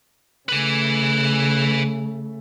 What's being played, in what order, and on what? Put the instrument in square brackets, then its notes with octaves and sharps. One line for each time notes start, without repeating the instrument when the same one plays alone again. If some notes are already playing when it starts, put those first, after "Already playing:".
[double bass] C#3 A3 [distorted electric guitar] B4 G#5